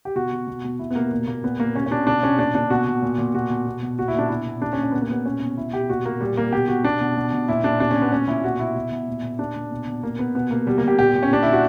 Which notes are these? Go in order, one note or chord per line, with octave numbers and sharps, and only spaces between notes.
G4
B2 F#4
B2
B2
B2
B2 E4
B3
B2 A#3
A#2 A#3
A#2 A#3
A#2 B3
A#2 A#3
B2 C#4
C#4
B2 D4
B2 D4
B2 C#4
A#2 D4
A#2 D4
B2 F#4
B2
A#2
A#2
B2 F#4
B2
B2
B2
A#2 F#4
E4
A#2
D4
B2 E4
B2
A#2 D4
C#4
A#2
C#4
A#2 B3
A#3
A#2 B3
B2 C#4
B2
B2 E4
B2 G4
A#2 F#4
A#2 A#3
A#2 G3
A#2 A#3
B2 G4
B2 F#4
B2 D4
B2
B2
B2
A#2 E4
A#2 D4
B2 D4
C#4
B2
B3
A#2 C#4
A#2 E4
B2 F#4
B2 E4
B2
B2
A#2
A#2
A#2 D4
A#2
B2
B2
A#2 A#3
A#2 B3
B2 B3
B2 A#3
B2 G3
A#3
B2 G4
A#2 G4
A#2
C#4
A#2 D4
A#2 E4
F#4